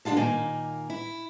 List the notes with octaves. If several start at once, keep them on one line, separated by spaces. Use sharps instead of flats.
D3 D4 F4 F5 A5
A#2 D#3 A#3 G#5
E4